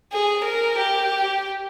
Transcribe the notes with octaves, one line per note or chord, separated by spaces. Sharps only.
G#4
A#4
G4